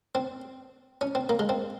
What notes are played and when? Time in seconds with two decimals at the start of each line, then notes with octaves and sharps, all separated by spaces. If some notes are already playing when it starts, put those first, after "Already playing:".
0.15 C4
1.01 C#4
1.15 C4
1.29 A#3
1.39 G#3
1.49 C4